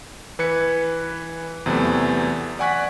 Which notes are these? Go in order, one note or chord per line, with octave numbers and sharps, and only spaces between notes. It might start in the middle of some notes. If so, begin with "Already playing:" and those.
E3 B4 G#6 C#7
E2 C3 E3 F#3 A3
D5 F#5 G#5 C#6 F#6 B6